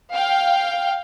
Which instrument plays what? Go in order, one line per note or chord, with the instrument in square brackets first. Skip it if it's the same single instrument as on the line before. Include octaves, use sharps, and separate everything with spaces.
[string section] F5 G5